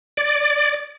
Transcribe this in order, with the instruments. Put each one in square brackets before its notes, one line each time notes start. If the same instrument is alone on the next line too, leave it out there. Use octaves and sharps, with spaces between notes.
[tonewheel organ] D5